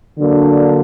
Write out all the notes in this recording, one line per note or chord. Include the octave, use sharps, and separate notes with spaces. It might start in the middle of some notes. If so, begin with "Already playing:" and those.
D3 F#3 A#3 D4